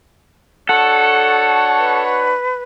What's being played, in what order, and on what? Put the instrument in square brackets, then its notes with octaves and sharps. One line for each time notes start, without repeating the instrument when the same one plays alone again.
[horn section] D4 F#4 C#5 [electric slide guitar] A4 [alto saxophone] F#5
[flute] B4